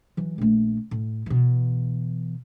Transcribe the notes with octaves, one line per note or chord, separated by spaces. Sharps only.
E3 F#3
A#1 A3
A2
B2 E3